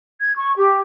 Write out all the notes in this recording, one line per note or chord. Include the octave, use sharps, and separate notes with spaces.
G#6
C#6
G4